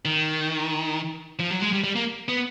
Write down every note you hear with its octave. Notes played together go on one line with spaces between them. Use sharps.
D#3
F3
F#3
G#3
G3
G3
A#3
B3